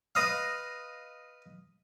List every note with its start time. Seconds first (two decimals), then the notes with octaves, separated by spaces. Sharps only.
0.15 B4 D#5 F5